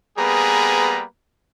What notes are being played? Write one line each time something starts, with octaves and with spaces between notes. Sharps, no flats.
G3 A#3 B3 G#4 B4 A#5